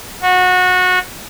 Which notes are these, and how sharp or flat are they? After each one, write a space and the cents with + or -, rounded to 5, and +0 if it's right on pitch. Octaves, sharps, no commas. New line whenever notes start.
F#4 -20